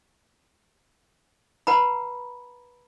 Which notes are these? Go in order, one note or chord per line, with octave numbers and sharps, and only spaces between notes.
B4 F#5 A#5 B5